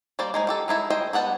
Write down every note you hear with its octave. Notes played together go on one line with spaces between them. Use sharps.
G3 A#3 C5 D5
G#3 D#4 G#4
D#3 G4 A4
G#3 D#4 E4 A4
G#4 C5 D#5 G5
G3 B3 F#5 A5